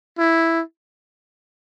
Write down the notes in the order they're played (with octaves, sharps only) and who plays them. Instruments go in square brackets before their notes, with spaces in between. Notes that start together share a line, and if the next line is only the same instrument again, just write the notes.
[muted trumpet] E4